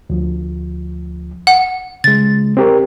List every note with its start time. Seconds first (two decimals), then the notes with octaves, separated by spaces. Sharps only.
0.10 D2 F3
1.47 F#5
2.04 C#3 G#3 A6
2.57 C4 G4 A#4